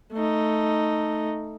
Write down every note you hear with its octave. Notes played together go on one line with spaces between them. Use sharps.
A3 D#4